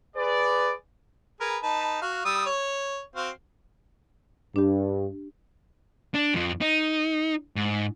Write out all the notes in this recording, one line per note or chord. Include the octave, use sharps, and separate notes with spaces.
G#4 B4 D5
G#4 A#4 B4
D#4 B4 A5
F#4 F5
G3 D#6 E6
C#5
C4 F#4 F5
G2 D4 G4
D4
F2 F3
D#4
G#2